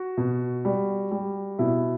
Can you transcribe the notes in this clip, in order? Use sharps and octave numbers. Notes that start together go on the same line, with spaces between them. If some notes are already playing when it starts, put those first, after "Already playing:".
Already playing: F#4
B2
G3
G3
B2 E4